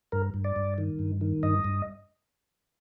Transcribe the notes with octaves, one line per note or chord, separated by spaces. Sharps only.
G2 A#4
G2
D5
G2
D#3
G2
D#3
G2 D#5
G2